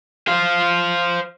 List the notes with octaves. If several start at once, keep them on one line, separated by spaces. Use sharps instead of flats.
C5 F5